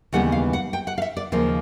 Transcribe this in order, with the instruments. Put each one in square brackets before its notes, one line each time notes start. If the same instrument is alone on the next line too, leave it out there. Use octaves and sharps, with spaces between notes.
[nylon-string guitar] D#2 C#3 E3 G3 B3 F#5
F5
F#5
G5
F#5
F5
E5
D5
D#2 C#3 F3 A#3 C5